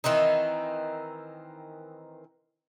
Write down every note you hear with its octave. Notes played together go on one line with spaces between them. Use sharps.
D#3 E3 C4 D#4